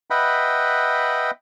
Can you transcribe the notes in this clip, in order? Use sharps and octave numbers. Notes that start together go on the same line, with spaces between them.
B4 D#5 E5 F#5 G5 B5